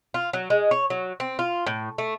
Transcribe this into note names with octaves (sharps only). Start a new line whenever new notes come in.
F4
F#3
G#3
C#5
F#3
C4
F4
A2
A3